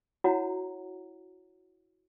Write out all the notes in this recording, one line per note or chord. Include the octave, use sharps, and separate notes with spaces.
E4 F#4 C#5 F#5 A#5